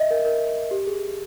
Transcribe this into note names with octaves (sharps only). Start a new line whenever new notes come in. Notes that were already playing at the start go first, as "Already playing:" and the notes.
Already playing: D#5 E5
A#4
A#4
G4
G#4